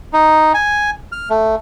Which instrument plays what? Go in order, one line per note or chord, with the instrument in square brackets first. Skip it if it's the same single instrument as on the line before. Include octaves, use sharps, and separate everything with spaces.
[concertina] D#4
G#5
F6
A3